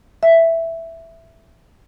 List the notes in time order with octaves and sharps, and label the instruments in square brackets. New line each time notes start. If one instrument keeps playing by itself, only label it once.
[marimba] E5